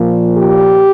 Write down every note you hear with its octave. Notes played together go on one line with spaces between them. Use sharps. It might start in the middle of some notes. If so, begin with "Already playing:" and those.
Already playing: A#2 F3
G4